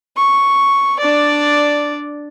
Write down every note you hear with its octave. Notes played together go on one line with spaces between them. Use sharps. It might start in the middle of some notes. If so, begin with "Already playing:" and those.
C#6
D4 D5